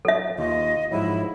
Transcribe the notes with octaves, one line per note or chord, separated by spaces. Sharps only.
F#3 A4 E5
D#2 F4 D#5
G#2 F3 F#3 E4